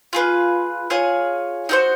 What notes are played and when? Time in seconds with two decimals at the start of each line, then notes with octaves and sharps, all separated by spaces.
0.13 F4 G#4 B4
0.90 F4 G#4 C#5
1.69 D#4 F#4 A4 C5